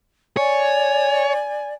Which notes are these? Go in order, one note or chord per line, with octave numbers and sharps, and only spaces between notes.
C#5 D5 G#5